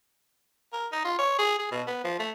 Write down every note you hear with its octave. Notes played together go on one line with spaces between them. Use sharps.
A#4
D#4
F4
C#5
G#4
G#4
B2
B3
F3
A3